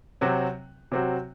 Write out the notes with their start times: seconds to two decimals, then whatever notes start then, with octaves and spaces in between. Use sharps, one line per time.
0.21 C3 F#3 C4 F#4
0.92 C3 F#3 C4 F#4